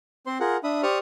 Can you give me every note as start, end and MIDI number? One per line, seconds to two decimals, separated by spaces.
0.26 0.38 60
0.26 0.38 72
0.26 0.38 84
0.40 0.57 65
0.40 0.57 68
0.40 0.57 70
0.40 0.57 78
0.64 0.82 62
0.64 0.82 76
0.64 0.82 83
0.64 0.82 87
0.83 0.99 67
0.83 0.99 72
0.83 0.99 74
0.83 0.99 85
0.83 0.99 87
0.83 0.99 89